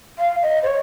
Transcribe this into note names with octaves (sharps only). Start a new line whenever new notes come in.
F5
D#5
C5
C#5